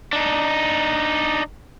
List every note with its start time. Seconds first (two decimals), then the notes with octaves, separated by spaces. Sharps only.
0.13 D4 D#4